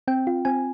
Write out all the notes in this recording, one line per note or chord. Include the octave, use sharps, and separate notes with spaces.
C4 G5
F4
C4 G#5